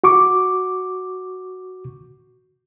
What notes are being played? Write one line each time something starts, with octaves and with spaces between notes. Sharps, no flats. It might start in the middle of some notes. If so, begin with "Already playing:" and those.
F#4 C#6 D6